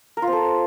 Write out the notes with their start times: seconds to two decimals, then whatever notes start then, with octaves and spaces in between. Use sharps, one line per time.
0.17 A#4
0.22 F4
0.27 C4
0.33 A4